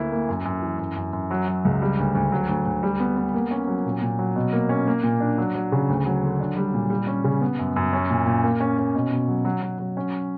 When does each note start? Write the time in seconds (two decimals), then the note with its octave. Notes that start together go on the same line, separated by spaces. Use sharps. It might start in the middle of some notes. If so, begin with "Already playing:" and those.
Already playing: D2 A#3 E4
0.12 A#3
0.29 F#2
0.45 F#2
0.62 E3
0.79 F#2
0.96 F#2
1.13 F#2
1.31 F#3
1.48 F#3
1.65 C#2
1.82 G3
1.98 D2
2.15 D2
2.32 F#3
2.49 D2
2.66 D2
2.83 G3
3.00 B3
3.17 B3
3.34 A#3
3.51 C#4
3.67 F#3
3.85 A#2
4.02 A#2
4.19 F#3
4.36 B2
4.53 A#3
4.69 C#4
4.87 A#3
5.03 A#2
5.20 D4
5.38 F#3
5.55 F#3
5.72 C#3
5.89 D2
6.06 F#3
6.23 D3
6.40 D4
6.57 G3
6.74 A#2
6.90 G3
7.07 C#4
7.24 C#3
7.41 B3
7.59 F#2
7.76 F#2
7.93 C#4
8.10 A#2
8.26 A#2
8.44 A#3
8.60 C#4
8.78 C#4
8.95 B2
9.12 B2
9.28 F#3
9.45 F#3
9.62 F#3
9.79 F#3
9.97 C#4